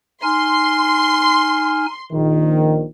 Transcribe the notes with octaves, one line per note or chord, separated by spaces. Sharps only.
D#4 G#5 C6 F6
A#1 D#3